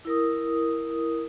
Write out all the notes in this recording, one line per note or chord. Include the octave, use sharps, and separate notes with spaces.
E4 A#4 D#6